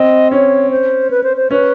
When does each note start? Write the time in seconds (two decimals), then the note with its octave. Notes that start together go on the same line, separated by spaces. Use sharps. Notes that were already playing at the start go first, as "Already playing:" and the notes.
Already playing: C4 D#5
0.31 C#4 C#5
0.71 C5
1.11 B4
1.24 C5
1.37 C5
1.51 C#4 B4